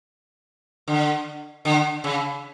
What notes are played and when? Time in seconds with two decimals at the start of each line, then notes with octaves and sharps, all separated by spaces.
0.88 D3
1.65 D3
2.04 C#3